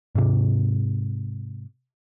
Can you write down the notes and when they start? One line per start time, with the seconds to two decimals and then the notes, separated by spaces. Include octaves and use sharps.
0.15 G#2 C3